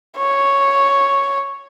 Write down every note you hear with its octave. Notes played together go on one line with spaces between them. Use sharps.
C#5